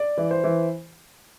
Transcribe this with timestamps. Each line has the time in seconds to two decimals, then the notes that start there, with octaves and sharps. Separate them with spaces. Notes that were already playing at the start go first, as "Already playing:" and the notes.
Already playing: D5
0.17 E3
0.31 C5
0.44 E3